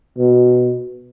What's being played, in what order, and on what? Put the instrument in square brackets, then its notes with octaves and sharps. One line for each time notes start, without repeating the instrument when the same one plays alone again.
[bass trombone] B2